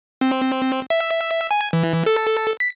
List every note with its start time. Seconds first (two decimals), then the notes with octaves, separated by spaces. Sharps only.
0.21 C4
0.90 E5
1.51 G#5
1.73 E3
2.06 A4
2.60 B6